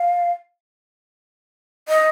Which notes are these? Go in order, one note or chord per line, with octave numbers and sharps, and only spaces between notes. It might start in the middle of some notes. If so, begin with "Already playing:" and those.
Already playing: F5
D#5